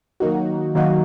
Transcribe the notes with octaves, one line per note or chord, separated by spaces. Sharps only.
D#3 F#3 A#3 D#4 F#4
D#3 F#3 A#3 D#4 F#4